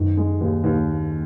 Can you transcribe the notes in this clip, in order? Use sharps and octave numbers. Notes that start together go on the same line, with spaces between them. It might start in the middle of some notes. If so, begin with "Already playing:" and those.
Already playing: F#2 D#3
G#3
D#2
D#2